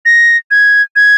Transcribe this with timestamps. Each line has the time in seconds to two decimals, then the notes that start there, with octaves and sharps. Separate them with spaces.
0.05 A#6
0.51 G#6
0.96 G#6